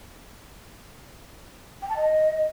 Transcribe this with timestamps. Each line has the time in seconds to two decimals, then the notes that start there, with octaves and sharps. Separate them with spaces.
1.82 G5
1.89 A5
1.96 D#5